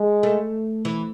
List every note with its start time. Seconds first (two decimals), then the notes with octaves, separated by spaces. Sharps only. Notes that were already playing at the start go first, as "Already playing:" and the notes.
Already playing: G#3
0.23 A3
0.85 E3